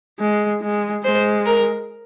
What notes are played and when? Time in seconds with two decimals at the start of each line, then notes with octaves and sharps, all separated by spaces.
0.19 G#3
0.62 G#3
1.04 G#3 C5
1.46 A#4